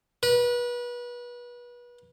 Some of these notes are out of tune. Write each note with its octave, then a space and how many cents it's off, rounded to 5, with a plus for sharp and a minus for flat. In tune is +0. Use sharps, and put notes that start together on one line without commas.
B4 -30